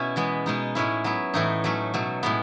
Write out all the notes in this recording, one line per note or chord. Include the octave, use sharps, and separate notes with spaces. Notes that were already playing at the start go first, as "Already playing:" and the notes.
Already playing: B2 C#4 E4
E3 G#3 B3
B2 G#3 D#4
A2 G#3 C#4 E4
F#3 B3 E4
A2 E3 A3 D#4
F#3 A3 C#4
B2 F#3 A3
A2 G#3 B3